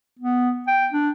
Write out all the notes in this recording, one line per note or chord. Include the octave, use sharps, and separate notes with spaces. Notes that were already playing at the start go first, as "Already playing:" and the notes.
B3
G5
D4